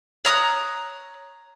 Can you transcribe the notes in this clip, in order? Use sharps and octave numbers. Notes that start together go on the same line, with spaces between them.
C#5 A#5 D#6 F#6